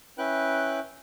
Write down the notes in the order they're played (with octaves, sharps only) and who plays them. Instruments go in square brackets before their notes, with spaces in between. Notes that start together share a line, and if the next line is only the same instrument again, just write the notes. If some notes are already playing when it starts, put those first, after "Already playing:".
[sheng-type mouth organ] C#4 E4 B4 G5 F#6